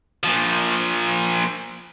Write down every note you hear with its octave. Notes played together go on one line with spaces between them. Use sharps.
A#2 F3